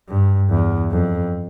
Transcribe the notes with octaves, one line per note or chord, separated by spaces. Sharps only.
G2
E2
F2